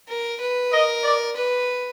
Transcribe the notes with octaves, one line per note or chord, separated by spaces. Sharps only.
A#4
B4
A#4 D#5
D5
B4